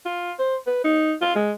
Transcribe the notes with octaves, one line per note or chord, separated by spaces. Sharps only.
F4
C5
B4
D#4
F4
G#3